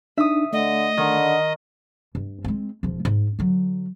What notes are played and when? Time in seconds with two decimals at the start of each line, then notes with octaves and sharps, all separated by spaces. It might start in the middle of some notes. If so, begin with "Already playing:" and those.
0.18 D4 D#4 E5 D#6
0.53 D3 A3 D#5
0.97 D3 D#3
2.15 G2
2.45 G#3 C4
2.83 E1 F3
3.05 G#2
3.39 D3 F#3